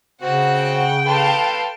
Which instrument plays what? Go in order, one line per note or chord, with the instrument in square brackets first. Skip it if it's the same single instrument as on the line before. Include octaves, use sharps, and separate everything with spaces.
[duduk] C#3 [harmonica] C4 F#4 [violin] F#5
[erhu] G5
[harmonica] A4 B4 C6 [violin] F5 A5